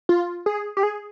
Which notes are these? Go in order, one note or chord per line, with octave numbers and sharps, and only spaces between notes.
F4
G#4
G4
G#4